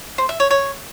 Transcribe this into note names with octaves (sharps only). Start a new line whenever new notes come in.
C5
E5
C#5
C#5